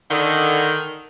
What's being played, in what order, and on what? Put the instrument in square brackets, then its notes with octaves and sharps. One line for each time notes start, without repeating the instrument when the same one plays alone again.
[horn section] D3 D#3